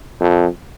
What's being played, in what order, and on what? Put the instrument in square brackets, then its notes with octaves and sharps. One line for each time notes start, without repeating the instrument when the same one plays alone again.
[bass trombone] F2